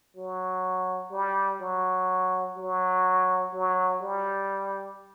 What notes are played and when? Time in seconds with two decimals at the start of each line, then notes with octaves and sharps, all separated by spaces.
0.16 F#3
1.12 G3
1.61 F#3
2.57 F#3
3.54 F#3
4.02 G3